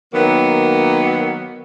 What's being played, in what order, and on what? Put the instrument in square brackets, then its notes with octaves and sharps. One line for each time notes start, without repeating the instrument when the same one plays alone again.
[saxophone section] D#3 F#3 A#3 B3